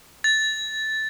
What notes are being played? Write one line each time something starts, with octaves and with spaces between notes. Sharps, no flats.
A6